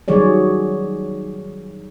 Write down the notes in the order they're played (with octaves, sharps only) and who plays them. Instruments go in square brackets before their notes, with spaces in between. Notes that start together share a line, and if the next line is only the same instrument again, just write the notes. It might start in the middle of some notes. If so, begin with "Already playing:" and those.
[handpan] D#3 F#3 G3 G#4 C#5 D5